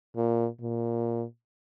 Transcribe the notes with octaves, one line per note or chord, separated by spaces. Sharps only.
A#2
A#2